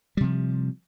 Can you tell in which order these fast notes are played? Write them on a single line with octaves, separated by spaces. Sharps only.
G3 C3 F3